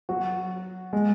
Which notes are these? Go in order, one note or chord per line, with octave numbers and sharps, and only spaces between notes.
F#3 F#4
G#3